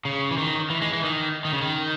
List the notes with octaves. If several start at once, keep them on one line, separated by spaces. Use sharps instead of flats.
C#3
E3
D#3
E3
G#3
E3
D#3
D#3
C#3
D#3